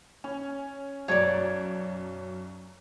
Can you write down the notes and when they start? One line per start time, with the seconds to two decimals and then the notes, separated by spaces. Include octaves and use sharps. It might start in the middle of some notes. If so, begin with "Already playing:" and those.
0.24 C#4
1.08 B1 F#2 C#5 D5